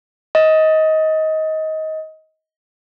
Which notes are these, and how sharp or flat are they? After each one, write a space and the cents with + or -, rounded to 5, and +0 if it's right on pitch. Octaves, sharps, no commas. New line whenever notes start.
D#5 +20